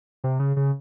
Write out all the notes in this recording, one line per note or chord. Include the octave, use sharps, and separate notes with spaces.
C3
C#3
C#3